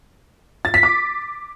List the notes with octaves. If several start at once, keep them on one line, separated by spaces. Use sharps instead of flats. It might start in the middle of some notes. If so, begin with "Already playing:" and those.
A6
B6
D6